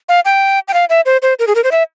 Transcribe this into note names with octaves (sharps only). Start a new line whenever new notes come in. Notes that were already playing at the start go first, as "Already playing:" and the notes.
F5
G5
G5
F5
E5
C5
C5
A#4
G#4
A#4
C5
E5